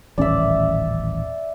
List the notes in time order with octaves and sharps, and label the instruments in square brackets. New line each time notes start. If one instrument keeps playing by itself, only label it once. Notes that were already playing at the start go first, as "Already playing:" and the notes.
[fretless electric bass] D#1 A1 C#4 [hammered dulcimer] D5 E5